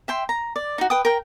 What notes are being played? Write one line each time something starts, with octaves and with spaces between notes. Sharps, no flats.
E5 G5 C6
A#5
D5
D#4 F#4
B4 G5 D#6
A#4 G5